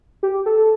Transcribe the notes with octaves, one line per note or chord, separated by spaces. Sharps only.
G4
A4